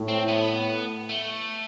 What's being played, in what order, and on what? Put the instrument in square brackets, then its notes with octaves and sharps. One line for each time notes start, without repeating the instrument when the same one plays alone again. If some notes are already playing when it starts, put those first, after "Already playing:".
Already playing: [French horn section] A2
[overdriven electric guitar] C4
B3
A3